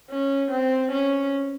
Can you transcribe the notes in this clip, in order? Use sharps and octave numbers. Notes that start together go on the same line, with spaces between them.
C#4
C4
C#4